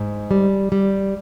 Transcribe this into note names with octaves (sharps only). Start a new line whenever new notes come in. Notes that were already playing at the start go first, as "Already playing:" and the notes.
Already playing: G#2
G3
G3